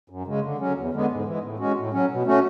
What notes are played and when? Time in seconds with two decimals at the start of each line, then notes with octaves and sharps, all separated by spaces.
0.10 F#2
0.27 C#3 G#3
0.43 D3
0.59 F#3 C#4
0.76 E2
0.93 D3 G#3 B3
1.10 G#2
1.25 E3 G#3
1.43 A2
1.59 G#3 C#4 F#4
1.76 A2
1.93 F#3 C#4
2.09 B2
2.26 A3 C#4 F#4